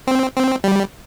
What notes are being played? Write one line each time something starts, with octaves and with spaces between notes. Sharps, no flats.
C4
C4
G3